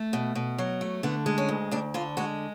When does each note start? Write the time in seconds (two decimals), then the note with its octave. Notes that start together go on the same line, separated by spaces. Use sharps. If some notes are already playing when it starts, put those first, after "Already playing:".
Already playing: A3
0.13 B2
0.35 B2
0.58 F#3
0.81 A3
1.03 D3 B3
1.26 G#3
1.38 C#4
1.48 D2
1.71 D2 D4
1.94 D3 F4
2.17 G#3 F#4